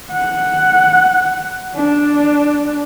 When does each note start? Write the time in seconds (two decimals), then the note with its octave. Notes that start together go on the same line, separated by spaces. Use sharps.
0.12 F#5
1.74 D4